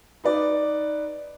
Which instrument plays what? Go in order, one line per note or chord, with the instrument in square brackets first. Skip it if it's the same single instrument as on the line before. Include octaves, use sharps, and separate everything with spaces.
[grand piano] D#4 B4 D5